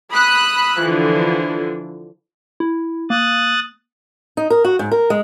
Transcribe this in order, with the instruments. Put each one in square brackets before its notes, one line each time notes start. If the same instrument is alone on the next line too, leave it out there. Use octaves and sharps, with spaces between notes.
[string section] B5 D#6 E6 F#6
D3 E3 F3
[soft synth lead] E4
[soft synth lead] A#3 [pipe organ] D#6 F#6 A6
[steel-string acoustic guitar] D#4
A#4
F#4
G#2
A#4
G#3